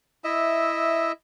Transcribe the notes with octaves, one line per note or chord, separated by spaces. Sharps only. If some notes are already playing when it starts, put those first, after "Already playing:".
E4 D#5 E5